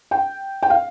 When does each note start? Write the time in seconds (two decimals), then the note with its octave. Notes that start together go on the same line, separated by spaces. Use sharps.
0.11 G5
0.63 G5
0.70 F5